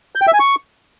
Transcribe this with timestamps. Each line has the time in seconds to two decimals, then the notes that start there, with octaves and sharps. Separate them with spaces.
0.15 G6
0.21 G5
0.27 E5
0.33 G#5
0.39 C#6